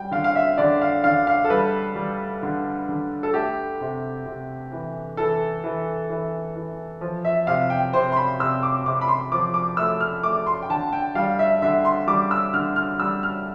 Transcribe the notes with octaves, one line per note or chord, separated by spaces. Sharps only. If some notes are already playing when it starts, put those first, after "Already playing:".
Already playing: G3 G5
D3 F5
F5
E5
D3 D5
F5
D3 F5
F5
A4
G3 B4
G3
D3
D3
A4
A3 G4
C3
C3
E3
E3 A4
E3
E3
E3
F3
E5
C3 F5
G5
C3 C5
C6
B5
C3 E6
D6
C3 D6
B5
C6
F3 D6
D6
A3 E6
F6
A3 D6
C6
G5
D3 A5
G5
G3 F5
E5
D3 E5
C6
G3 D6
E6
D3 F6
F6
G3 E6
F6